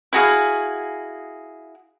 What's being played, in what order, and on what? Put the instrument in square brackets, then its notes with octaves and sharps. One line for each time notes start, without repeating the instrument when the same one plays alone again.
[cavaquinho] E4 F#4 G#4 F5